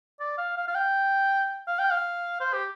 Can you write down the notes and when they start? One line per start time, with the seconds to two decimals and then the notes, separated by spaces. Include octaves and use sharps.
0.20 D5
0.38 F5
0.57 F5
0.68 F5
0.75 G5
1.67 F5
1.79 G5
1.90 F5
2.40 C5
2.53 G4